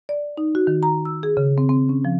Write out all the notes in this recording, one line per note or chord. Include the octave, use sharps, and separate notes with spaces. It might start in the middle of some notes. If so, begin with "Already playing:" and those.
D5
D#4
F#4
D#3
A#5
E6
G#4
C#3
C4
C4
C#4
F3